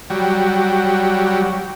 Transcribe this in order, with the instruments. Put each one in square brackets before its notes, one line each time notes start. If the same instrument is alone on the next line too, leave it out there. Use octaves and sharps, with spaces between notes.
[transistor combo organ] F#3 G3